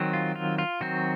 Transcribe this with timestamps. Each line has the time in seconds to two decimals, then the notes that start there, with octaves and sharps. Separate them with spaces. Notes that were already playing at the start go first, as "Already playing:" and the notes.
Already playing: D#3 F#3 C4
0.13 F4
0.36 F4
0.58 F4
0.81 D#3 F#3 C4 F#4